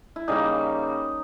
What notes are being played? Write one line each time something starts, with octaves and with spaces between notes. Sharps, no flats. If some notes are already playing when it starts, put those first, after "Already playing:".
E4
C#3 G3 A#3 D#4